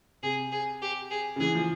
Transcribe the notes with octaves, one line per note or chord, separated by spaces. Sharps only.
C3 G#4
G#4
G4
G#4
C#3
E3 G#4
F3